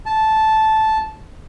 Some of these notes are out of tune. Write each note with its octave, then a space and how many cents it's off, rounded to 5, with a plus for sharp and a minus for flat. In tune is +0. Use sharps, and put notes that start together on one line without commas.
A5 -10